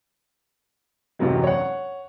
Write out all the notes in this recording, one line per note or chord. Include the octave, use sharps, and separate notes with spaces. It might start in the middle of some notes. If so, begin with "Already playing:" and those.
A1 F#2 C3 E3 F#3 G#3
C#5 F#5